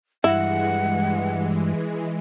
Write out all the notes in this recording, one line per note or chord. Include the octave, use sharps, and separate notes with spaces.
G2 E3 G#3 E4 F#5